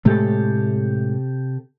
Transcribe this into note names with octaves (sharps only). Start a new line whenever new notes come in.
A2 C3 G#3 A3 G4 A4